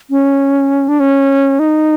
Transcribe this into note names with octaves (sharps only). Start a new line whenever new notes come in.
C#4
D4
C#4
D#4